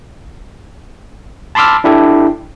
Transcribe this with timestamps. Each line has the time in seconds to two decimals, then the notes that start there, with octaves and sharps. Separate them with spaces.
1.55 A5 B5 C6 D6 E6 F6
1.84 D4 E4 G4 A4